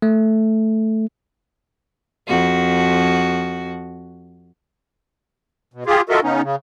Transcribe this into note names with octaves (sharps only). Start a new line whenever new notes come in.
A3
F2 F#4
B2
F4 G4 G#4
F4 F#4 A4 A#4 D#5 E5
C#3 B3 C#4 D#4
C#3